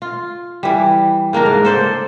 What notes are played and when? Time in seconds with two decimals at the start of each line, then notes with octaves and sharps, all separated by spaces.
0.02 F4
0.63 E3 G3
1.33 C#3 A#3 D4 A#4
1.46 G#2
1.65 A4 C5 D5